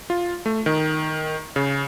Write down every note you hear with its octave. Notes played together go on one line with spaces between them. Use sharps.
F4
A3
D#3
C#3